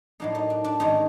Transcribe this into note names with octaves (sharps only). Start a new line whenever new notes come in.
A2 F#3 A#3 D4 D#4
D#4
D4
D4
G#2 D#3 G#3 C#4 D#4